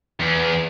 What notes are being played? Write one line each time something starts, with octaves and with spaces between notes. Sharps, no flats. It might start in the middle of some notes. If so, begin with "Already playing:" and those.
E2